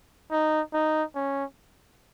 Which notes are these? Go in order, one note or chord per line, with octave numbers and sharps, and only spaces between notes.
D#4
D#4
C#4